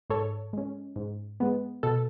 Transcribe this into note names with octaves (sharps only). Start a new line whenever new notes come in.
G#2 A4 C#5
G#3 C#4
G#2
G#3 B3
B2 A4